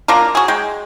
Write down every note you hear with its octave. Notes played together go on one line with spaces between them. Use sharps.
A#3 D4 F4 A#4
F#4 G#4
G#3 G5